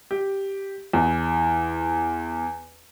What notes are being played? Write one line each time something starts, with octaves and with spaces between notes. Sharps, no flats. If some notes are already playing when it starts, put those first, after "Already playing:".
G4
E2